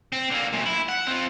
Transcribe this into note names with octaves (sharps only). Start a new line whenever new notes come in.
C4
D3 A#3
F#2 A#2
E4
F#5
C4 F4